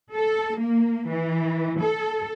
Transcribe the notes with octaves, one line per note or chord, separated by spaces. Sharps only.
A4
A#3
E3
A4